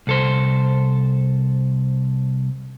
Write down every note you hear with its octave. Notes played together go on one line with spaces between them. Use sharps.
C2 A4 C5